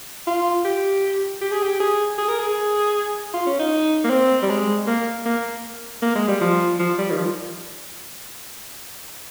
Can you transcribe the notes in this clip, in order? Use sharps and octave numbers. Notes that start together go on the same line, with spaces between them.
F4
G4
G4
G#4
G4
G#4
G#4
A#4
G#4
F4
C#4
D#4
A#3
C4
G3
G#3
A#3
A#3
A#3
G#3
G3
F3
F3
G3
D#3
F3